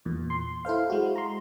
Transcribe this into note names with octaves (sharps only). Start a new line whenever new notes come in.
E2 A#2
C6
E4 A4 C5 F5
G#3 F#4
A#5 C6